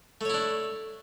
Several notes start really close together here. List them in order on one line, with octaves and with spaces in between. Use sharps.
A3 C#5 E4 D4